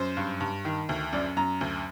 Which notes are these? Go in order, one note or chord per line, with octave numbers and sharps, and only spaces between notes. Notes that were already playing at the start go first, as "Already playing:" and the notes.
Already playing: F#2 C5
G2
G2
D#3
D2
F#2 D5
F#2 A#5
D2